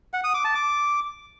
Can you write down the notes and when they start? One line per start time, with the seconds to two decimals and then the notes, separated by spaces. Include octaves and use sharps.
0.14 F#5
0.24 D#6
0.34 D6
0.45 A5
0.55 D6